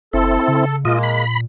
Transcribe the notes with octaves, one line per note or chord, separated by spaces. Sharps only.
F#1 C4 E4 A4
C#3
A#2 G#3 A#3 F4 D#5
B5